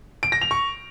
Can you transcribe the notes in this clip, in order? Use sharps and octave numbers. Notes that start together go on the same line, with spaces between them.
D7
A#6
F7
C#6